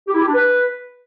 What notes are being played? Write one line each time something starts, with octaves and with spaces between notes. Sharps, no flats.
G4
E4
G4
D4
B4